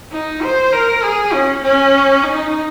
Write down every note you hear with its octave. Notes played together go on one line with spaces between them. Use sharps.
D#4
C5
A#4
G#4
C#4
C#4
D#4